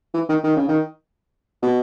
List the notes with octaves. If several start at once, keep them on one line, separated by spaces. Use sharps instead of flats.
E3
D#3
D#3
C#3
D#3
B2